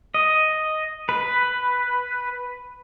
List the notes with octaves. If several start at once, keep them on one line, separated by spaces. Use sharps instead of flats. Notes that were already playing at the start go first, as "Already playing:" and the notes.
D#5
B4